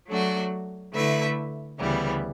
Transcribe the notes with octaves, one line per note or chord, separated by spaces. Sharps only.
F#3 A3 D4 F#4
D3 A3 E4 B4 E5
D2 C#3 E3 G3 B3